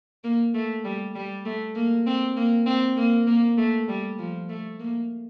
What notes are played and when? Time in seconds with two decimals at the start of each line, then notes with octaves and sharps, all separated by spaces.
0.24 A#3
0.54 A3
0.85 G3
1.15 G3
1.45 A3
1.75 A#3
2.06 C4
2.37 A#3
2.66 C4
2.97 A#3
3.27 A#3
3.57 A3
3.88 G3
4.19 F3
4.49 A3
4.79 A#3